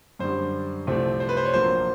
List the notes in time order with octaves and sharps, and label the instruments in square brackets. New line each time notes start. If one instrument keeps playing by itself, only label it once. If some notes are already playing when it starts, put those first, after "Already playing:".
[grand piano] F#2 D3 G3 C5
C2 C3 F3 A3 C4
C5
B4
C5
C#5
A#1 A#2 F#3 A#3 C5